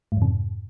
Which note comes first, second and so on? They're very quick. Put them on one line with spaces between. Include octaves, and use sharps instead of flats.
G#2 F2 C3